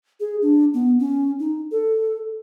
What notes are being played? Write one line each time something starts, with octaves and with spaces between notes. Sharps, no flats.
G#4
D4
B3
C#4
D#4
A4